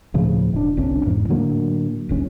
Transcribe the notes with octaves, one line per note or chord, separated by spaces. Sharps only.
D2 A2 C#3 F3
E1 D4
G1 C2 C#4 D4
E2 G#2
A2 D3 F#3 A#3
D1 G1 C#4